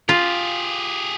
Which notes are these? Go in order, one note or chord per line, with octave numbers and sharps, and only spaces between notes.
F4 G4 G#4